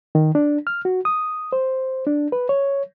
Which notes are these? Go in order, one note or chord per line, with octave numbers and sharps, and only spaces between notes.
D#3
D4
F6
F#4
D#6
C5
D4
B4
C#5